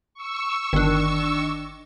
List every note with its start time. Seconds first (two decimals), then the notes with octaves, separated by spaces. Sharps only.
0.14 C#6 E6
0.73 G1 D#3 D4